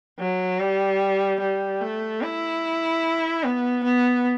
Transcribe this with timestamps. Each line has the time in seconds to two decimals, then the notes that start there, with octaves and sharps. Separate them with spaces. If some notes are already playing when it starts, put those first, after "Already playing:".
0.19 F#3
0.59 G3
1.40 G3
1.81 A3
2.22 E4
3.43 B3
3.84 B3